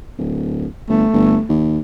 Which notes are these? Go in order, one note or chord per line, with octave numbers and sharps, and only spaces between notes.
D1
G1 A3
G1
D#2